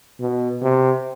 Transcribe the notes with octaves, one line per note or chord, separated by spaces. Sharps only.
B2
C3